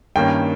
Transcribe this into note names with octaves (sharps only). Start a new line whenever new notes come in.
G2 D#3 A#3 C#4 G5